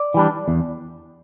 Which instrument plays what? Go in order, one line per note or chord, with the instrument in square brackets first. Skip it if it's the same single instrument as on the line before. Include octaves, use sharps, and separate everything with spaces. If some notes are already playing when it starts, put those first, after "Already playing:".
Already playing: [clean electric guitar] D5
E3 G3 D4
E2